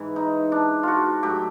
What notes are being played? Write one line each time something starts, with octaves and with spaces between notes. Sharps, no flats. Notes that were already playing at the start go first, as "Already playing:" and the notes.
Already playing: G#2 E3
D#4
D4
F4 F#4
A2 F#3 G4